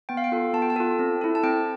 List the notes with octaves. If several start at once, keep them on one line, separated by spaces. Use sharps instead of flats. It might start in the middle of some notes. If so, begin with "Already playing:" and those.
B3 G5
F5
G5
F4 A4
B3 A5
G5
A5
F4 A4
C4
E4 A4
A5
C4 G5